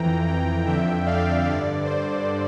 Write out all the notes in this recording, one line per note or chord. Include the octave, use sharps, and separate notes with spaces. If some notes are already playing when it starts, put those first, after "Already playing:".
Already playing: F2 E3 G5 A#5
G5 A#5
F2 D3 E5 G5
D5 F5
G2 D3 D5
C5